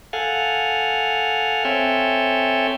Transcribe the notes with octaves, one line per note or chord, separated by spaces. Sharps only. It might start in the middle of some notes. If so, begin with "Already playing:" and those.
A4 F5 F#5 G#5
C4 A4 C#5 E5 G5 G#5